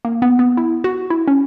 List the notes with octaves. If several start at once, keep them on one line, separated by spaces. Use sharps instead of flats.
A#3
B3
B3
E4
F#4
E4
C#4